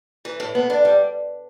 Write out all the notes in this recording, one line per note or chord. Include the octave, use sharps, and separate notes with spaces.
E3
A2
B3
D4
G3